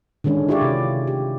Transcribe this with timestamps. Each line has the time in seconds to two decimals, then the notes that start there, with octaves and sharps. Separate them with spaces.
0.24 D3 D#3 G#3 C#4 D4
0.49 E4 F4 G4 G#4 C#5 D5
0.62 C3
1.07 G4